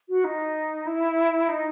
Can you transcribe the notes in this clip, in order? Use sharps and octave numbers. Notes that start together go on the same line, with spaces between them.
F#4
D#4
E4
D#4